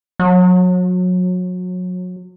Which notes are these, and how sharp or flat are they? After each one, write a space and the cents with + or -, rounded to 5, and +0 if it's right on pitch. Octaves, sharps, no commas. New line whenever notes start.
F#3 -30